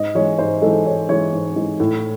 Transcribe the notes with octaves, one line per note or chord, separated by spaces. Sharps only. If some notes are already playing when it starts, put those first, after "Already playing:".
Already playing: G#2 D#5
E3 G#3 C#5
G#2 C5
E3 G#3 A4
G#2 C#5
E3 G#3 C#5
G#2
E3 G#3
A2